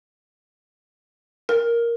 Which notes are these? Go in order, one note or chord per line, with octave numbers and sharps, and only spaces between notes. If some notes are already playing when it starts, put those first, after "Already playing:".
A#4